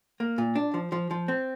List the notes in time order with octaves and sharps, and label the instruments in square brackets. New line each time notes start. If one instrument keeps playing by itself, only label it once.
[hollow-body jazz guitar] A#3
A#2
D4
F3
F3
F3
C4